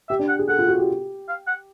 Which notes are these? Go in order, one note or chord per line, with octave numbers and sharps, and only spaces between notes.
G4 E5
D4
F#5
G#4
A4 F#5
F4
F#4
G4
F5
F#5